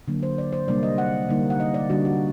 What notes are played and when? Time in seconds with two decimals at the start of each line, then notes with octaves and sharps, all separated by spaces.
0.08 D3 F#3 A#3
0.23 C5
0.38 D5
0.53 C5
0.68 C3 G3 A#3 D4 D5
0.83 D#5
0.98 F#5
1.29 D3 G3 A#3 D#4
1.50 F#5
1.60 D#5
1.74 D5
1.90 D3 G3 D4 F#4
2.05 F#4